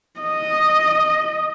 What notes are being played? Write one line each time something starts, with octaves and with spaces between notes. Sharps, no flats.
D#5